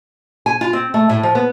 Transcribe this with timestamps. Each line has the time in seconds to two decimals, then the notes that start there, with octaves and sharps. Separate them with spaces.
0.46 G#5
0.61 F4
0.73 C4
0.94 A3
1.09 A2
1.23 F3
1.35 B3